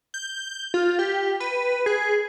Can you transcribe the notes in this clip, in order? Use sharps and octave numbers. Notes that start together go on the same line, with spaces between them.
G6
F4
G4
B4
G#4